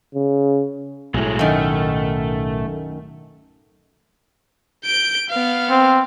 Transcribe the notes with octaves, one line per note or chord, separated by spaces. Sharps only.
C#3
B1 A2 F#3 G#3 A3
F#2 D#3 A3
G6 D7
B3 F5
C4